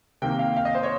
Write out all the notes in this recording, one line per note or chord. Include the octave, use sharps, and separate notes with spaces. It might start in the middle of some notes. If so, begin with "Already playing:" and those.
C3 D#3 A#3 G5
F5
F5
D#5
C5
C#5